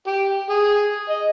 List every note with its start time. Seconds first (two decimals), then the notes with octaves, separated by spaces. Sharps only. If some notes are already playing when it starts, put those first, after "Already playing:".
0.07 G4
0.50 G#4
1.09 D#5